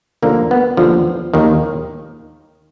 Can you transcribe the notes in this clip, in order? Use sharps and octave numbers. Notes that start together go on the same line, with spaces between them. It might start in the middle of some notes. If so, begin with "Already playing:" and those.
D#2 D3 F3 A#3
B3
D#2 D3 F3
D#2 D#3